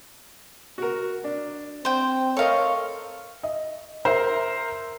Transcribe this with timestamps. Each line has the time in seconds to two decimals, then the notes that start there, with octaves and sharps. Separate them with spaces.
0.78 F#4 A#4
1.24 D4
1.85 C4 C5 G5
2.37 A4 A#4 C#5 D#5 F5 C#6
3.43 D#5
4.05 A#4 C5 E5 A#5